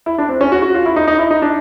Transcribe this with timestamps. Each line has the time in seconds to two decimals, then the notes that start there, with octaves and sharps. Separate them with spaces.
0.06 E4
0.18 D4
0.29 C4
0.41 C#4
0.52 F#4
0.62 F#4
0.74 F4
0.86 E4
0.96 D#4
1.08 D#4
1.19 E4
1.30 D#4
1.42 D4